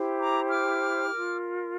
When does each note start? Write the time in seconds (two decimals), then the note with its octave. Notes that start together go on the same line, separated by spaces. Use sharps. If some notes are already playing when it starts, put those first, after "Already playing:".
Already playing: E4 G4 C5
0.19 A#5 D6
0.50 D6 F6
1.11 F4 A#4